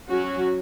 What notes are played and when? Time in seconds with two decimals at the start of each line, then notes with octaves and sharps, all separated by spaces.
0.10 F#3 C#4 F#4